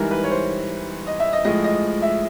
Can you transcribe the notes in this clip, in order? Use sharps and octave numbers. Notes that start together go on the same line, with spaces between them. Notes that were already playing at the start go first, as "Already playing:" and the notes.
Already playing: G#2 E3 G3 A#4
B4
C#5
C5
D#5
E5
D#5
A2 F3 G#3 D#5
D#5
E5